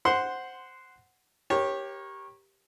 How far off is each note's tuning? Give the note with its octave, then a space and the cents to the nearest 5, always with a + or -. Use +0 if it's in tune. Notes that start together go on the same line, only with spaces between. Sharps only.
C5 +0 F#5 +0 C6 -10
G4 +0 A#4 +20 C#5 -20